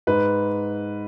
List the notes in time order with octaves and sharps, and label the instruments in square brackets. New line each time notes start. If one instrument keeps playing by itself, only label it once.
[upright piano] G#2 B4